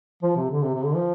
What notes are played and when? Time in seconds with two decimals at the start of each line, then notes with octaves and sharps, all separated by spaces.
0.23 F3
0.37 C3
0.51 D3
0.63 C3
0.74 C3
0.85 D3
0.95 F3